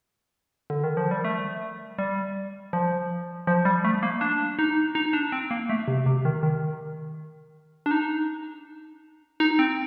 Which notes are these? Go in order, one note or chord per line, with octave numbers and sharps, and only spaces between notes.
D3
D#3
F3
G3
A3
G3
F3
F3
G3
A3
A#3
D4
D#4
D#4
D4
C4
A#3
A3
C3
C3
D#3
D#3
D4
D#4
D#4
C4